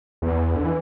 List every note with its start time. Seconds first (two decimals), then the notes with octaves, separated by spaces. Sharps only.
0.22 E2
0.56 D3
0.65 E3